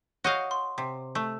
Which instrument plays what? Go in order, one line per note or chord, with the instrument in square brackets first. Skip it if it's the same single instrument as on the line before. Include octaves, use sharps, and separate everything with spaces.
[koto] F#4 D#5 F5 [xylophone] C#5 G6
[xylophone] C6
[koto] C3
A3